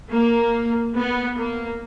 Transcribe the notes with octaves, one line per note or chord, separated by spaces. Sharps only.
A#3
B3
A#3